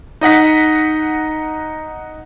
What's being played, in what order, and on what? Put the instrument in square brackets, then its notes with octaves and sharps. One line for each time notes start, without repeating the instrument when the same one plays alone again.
[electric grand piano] D#4 D#5 F#5 B6